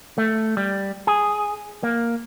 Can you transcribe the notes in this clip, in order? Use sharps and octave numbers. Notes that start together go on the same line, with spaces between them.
A3
G3
G#4
A#3